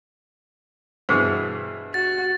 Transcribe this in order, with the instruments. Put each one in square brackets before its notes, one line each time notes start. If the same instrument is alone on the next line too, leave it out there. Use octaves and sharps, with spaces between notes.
[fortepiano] G2 B2 E3 [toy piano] G#4 C5
[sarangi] F#4 [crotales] A6